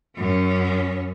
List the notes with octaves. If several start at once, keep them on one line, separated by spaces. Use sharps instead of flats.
F#2 C#4